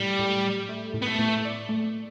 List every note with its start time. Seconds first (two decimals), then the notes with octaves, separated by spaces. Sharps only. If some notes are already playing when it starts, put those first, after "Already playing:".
Already playing: A2 G3
0.19 A2
0.44 G4
0.69 A3
0.94 A2
1.02 B3
1.07 A3
1.19 A2
1.45 D5
1.69 A3